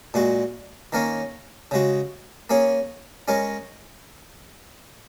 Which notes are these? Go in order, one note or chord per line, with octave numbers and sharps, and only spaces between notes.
A#2 G#3 F#4
D#3 A#3 C#4 A#4 C#5
C#3 G#3 F#4
A#3 C#4 G#4 C#5
G#3 C#4 A#4 C#5